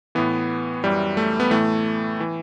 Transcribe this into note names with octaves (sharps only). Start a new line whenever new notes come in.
A2 E3 B3
F#2 E3 G3
A3
B3
A2 E3 A3
E3